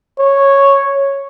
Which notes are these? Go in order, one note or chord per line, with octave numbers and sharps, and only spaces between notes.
C#5